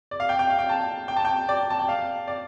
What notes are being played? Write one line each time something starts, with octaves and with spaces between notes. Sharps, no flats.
D5
F5
G5
G5
F5
G5
A5
G5
A5
G5
D5
A5
G5
F5
D5